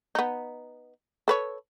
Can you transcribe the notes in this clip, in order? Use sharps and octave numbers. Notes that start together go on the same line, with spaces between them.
B3 D#4
A4 B4 C#5